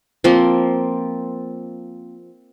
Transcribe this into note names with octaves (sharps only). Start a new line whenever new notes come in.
F3 A#3 C4